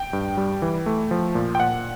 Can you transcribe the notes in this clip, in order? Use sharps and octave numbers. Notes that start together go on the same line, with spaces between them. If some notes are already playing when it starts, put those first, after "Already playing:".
Already playing: G5
G2
G3
E3
A3
F3
A#2
G5
A#2 F#5